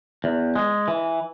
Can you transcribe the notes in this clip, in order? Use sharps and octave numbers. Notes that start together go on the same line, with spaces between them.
E2
G#3
E3